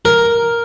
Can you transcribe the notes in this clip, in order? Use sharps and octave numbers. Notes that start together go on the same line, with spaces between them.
A#4